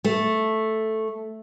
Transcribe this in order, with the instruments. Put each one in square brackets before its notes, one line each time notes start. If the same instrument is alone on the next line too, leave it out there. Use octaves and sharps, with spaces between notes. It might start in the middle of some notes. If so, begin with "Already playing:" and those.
[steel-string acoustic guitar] A3